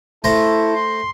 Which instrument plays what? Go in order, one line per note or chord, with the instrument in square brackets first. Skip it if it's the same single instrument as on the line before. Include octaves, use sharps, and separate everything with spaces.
[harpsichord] A3 C5 A#5 [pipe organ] E4 A4
[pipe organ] C6